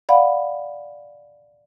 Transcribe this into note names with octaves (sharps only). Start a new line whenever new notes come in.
D5 F5 F#5 B5